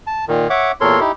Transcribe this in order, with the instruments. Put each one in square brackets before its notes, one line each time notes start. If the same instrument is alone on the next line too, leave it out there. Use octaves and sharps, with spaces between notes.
[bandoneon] A5
A#2 D#3
C#5 E5 F#5 D6
E2 A#2 A4 A#4 C#5 C6
D#4 E4 G4